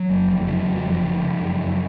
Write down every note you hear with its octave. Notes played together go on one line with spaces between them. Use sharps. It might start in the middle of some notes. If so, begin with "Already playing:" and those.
Already playing: F#3
F#1
F2
C#3 F#3
F2 F#3
F#3
F#1
F3
C#3
C#3
F#2
F#2